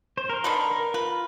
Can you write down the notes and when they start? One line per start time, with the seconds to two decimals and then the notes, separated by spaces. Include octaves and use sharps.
0.17 C5
0.30 A#4 C6
0.44 D3 D#4 B4
0.71 A#4
0.94 F4 B4